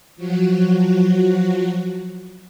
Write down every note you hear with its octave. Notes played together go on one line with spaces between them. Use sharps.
F3 F#3 F#4